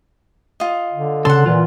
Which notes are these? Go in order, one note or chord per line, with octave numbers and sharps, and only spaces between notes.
F4 D#5
D3
C#3 A4 F#5 C6
A#2 E3 F4